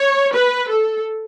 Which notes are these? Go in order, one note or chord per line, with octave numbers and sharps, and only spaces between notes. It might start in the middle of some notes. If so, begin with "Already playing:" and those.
Already playing: C#5
B4
A4